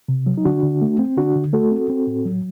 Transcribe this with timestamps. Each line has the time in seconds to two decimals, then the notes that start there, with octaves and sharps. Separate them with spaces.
0.09 C3
0.26 F#3
0.38 D#4
0.45 D3 D4 F#4
0.63 D3
0.82 A3
0.99 C4
1.17 D3 D4 F#4
1.35 D3
1.53 A3 F#4 A4
1.71 C4
1.90 C4
2.07 A2
2.26 F#3